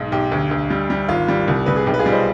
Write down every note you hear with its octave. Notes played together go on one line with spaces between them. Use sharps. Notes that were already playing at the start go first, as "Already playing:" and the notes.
Already playing: B1 G#2
B1 G4
D2
D2
G3
G3
G#1 F4
G3
C2
C2 B4
G#4
B1 G4
B4
F4 G#4
G3
C5 D#5